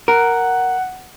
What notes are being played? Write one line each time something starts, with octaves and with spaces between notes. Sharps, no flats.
A#4 F#5